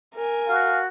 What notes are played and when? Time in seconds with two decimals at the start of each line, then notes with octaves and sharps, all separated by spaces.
0.14 A#4 G#5
0.49 F#4 F5